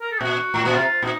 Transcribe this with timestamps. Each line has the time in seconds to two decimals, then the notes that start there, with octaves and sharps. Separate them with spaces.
0.01 A#4
0.11 A4
0.21 A#2 F#4
0.54 A2
0.65 A#2
0.75 C3 F4
1.02 A#2 D#4